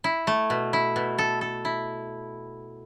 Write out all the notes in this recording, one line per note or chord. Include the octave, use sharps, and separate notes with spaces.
E4
A3
B2
E4
B2
A4
A4
E4